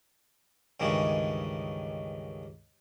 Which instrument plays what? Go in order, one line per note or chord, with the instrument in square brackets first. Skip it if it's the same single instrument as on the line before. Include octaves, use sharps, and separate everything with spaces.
[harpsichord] C#2 G2 D#3 E3 G#3 C#4